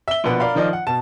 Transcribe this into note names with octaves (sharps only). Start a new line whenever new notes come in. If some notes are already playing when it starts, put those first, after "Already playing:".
E5 G7
A#1 B2 B4 F#5
A#4 D5 F5 B5
D#3 F3 F4 D5 D#5
F#5
B2 A5